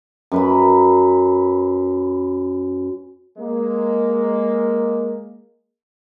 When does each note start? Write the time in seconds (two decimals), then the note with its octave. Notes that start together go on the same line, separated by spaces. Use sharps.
0.32 F#2 B4 B5
3.39 G#3 A#3